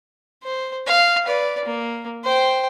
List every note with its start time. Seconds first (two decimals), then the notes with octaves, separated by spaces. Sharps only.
0.43 C5
0.86 F5
1.25 B4 D5
1.65 A#3
2.24 C5 G5